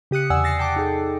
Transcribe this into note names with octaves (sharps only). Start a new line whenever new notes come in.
C#3 G4 D#6 F#6 C#7
E2 C3 D5 F#5 G#5 E6
A6 A#6 C7 C#7
G5 A5 D6
D#4 G#4 A4